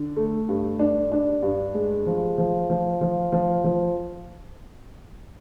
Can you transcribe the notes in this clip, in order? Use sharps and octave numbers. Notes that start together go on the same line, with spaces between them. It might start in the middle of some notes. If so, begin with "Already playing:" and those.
Already playing: D3
A3
G2
D4
D4
G2
G#3
F3
F3
F3
F3
F3
F3